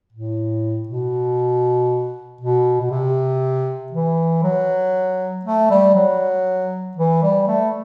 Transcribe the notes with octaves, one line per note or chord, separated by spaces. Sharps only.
A2
B2
B2
B2
C3
E3
F#3
A3
G3
F#3
E3
G3
A3